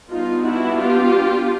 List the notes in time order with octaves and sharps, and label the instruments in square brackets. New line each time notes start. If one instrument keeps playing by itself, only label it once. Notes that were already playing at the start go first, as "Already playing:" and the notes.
[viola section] G3 B3 D4 D#4 F4
E4 F#4
F4 G4